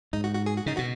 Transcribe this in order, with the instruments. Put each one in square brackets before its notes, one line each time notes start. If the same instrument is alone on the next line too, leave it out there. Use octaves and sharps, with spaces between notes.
[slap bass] G#2 [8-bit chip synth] D#4
[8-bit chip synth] F#4
F#4
G#4
F#4
[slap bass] C#3 [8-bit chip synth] D#4
[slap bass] B2 [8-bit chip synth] F#4